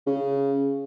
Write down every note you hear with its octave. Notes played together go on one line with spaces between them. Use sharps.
C#3